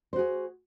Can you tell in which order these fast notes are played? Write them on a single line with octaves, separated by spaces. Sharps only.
C5 F#4 G#4